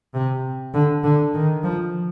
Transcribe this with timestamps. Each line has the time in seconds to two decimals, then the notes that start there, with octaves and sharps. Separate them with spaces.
0.14 C3
0.74 D3
1.04 D3
1.34 D#3
1.64 F3